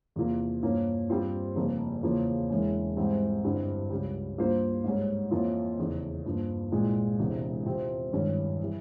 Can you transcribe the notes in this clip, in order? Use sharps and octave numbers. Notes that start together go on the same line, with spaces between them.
E2 C3 F3 A#3 F4
G2 F3 A#3 C#4
G2 G3 C4 F4 C5
F1 F2 C#3 G3 A#3
E2 C#3 F3 A#3 F4
E1 E2 E3 G#3 C#4
G#2 E3 G3 C4
G1 G2 G3 C4 E4
C#2 C#3 G3
G2 G3 A#3 F4 C5
G#2 G3 C#4
F2 E3 A#3 C#4 F4
F1 E2 C#3
G2 F3 A#3
C2 A#2 F3 G#3
E1 E2 C3
C3 F3 C4 G4
G#1 G2 G3 C#4 E4
E3 G3